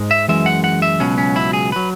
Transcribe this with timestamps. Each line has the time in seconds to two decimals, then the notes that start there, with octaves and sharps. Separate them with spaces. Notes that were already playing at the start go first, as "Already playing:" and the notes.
Already playing: G#2 G#3
0.11 E5
0.28 F#2 E3 G#3 E5
0.46 F#5
0.64 F#5
0.82 E5
1.00 C#2 B2 F#3 C#4
1.18 C#4
1.36 E4
1.53 G#4
1.72 F#3 B4